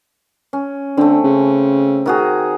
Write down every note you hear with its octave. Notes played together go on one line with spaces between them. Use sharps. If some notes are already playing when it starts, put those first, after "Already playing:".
C#4
D3 A3 C4
C#3
D#3 F#4 G#4